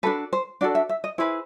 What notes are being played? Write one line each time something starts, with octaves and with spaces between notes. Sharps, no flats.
D4 F#4 A4 B4
C5
D4 F#4 A4 D5
E5
E5
D#5
E4 G#4 B4 C5